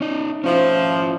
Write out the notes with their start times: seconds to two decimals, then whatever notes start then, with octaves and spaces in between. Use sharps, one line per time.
0.01 C#4 D#4
0.44 F3 C#4 E4